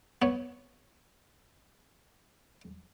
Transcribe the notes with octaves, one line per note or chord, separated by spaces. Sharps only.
B3 C#5